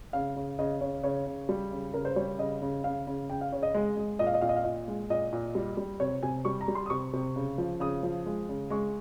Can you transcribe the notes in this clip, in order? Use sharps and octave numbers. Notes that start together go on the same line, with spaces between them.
C#3 F5
C#3
C#3 D#5
C#3 C#5
C#3 C#5
C#3
G3
C#3
C#3 A#4
C5
G3 C#5
C#3 D#5
C#3
C#3 F5
C#3
C#3 G5
F5
C#3 C#5
D#5
G#3
G#3
A#2 D#5
F5
D#5
A#2 F5
D#5
F5
A#2 D#5
G#3
A#2 D#5
A#2
G3
G3
C3 C#5
C3 G#5
G3 C#6
A#5
G3
C6
D#6
C3 C#6
C3
C#3
F3
C#3 D#6
F3
G#3
C#3
G#3 C#6